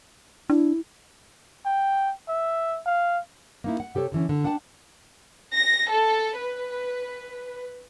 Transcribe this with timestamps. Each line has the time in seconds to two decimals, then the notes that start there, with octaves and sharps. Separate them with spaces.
0.50 D4 E4
1.65 G5
2.28 E5
2.86 F5
3.64 A#3 D#4 E4
3.80 F#5
3.95 C3 G4 A4 C#5
4.12 D3 E3 C#4
4.29 D3
4.44 D4 F#5 G5 A5
5.55 A#6
5.92 A4
6.41 B4